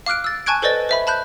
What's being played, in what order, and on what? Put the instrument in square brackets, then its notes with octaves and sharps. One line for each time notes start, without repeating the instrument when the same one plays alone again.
[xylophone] F5 D6 F6 F#6 D7
E6 A6
G#5 A5 C#6 F#6 G#6 D7
A4 B4 C5 D5 D#5 A6
C5 E5 B5
A5 B5 F#6 G6